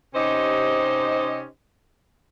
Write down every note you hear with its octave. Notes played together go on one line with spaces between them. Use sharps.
C3 C#4 D#4 G4 C5 D#5